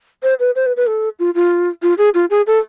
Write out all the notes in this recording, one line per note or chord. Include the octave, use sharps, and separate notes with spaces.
C5
B4
C5
B4
B4
A4
F4
F4
F4
G#4
F4
G#4
A4